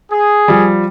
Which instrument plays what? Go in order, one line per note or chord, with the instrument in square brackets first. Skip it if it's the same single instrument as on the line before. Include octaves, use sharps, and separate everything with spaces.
[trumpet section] G#4
[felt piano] F3 G3